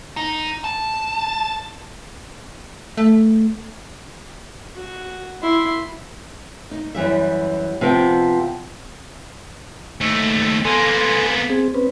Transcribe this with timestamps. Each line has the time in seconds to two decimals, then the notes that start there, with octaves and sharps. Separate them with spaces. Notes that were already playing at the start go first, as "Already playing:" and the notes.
0.17 D#4
0.64 A5
2.97 A3
4.76 F#4
5.42 E4 C6
6.71 D#4
6.95 F#2 E3 G3 E5
7.81 C3 F3 B3 G5
10.01 D#2 A3
10.65 A#3 B3 A4 G#5 C6
11.50 C4 G#4
11.75 C4 C#4 B4